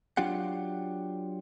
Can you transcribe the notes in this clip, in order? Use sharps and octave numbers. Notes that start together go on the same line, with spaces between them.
F#3 D4 F4 G4 F#5